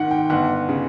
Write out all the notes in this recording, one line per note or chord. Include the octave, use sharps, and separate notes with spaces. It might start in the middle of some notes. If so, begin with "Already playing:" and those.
Already playing: G#1 D#3 F#5
G5
G1 F#5
C#3